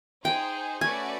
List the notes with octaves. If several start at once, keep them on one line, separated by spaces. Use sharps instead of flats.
D#4 G#4 C5 G5
A3 C#4 F#4 B4 D5 G#5